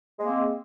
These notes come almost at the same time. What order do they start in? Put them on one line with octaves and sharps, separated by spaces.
G#3 A#3 C4